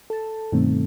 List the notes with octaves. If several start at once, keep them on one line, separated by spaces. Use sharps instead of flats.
A4 A5
G2 B2 D#3 A3 C4